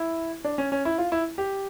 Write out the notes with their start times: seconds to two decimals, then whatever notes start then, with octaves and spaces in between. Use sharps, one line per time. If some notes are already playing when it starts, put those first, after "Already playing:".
Already playing: E4
0.44 D4
0.58 C#4
0.72 C#4
0.85 E4
0.98 F4
1.12 E4
1.38 G4